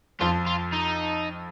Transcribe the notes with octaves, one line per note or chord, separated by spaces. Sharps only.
F2 F3 F4
F4
D#4